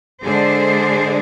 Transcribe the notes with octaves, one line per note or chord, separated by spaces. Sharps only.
D3 G#3 D4 G#4 C5